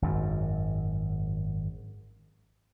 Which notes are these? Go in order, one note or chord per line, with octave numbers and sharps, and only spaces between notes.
G#1 F#2